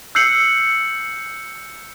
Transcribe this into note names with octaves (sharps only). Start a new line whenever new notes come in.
E6 F#6 G6 C7 C#7 F#7